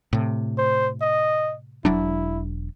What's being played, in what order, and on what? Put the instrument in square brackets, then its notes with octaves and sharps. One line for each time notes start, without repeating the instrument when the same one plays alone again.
[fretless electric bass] A2 C3
[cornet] C5
D#5
[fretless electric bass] E1 F#3 D4 [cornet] E4